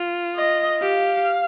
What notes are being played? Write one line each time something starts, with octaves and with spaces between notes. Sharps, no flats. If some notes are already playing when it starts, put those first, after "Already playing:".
Already playing: F4
D#5
G4 F5